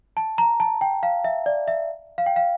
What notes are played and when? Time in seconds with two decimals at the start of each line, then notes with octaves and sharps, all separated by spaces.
0.17 A5
0.38 A#5
0.60 A5
0.81 G5
1.03 F5
1.25 E5
1.46 D5
1.68 E5
2.18 F5
2.26 G5
2.36 F5